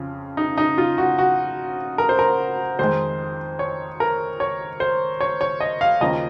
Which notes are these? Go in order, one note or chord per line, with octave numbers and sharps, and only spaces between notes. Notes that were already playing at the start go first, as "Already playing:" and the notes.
Already playing: F2 C#3 F3
D#4
D#4
F4
F#4
F#4
A#4
C5
A#4
F2 D#3 G#3 C5
C#5
A#4
C#5
C5
C#5
C#5
D#5
F5
D#2 C#3 F3 A#3 C#4 D#5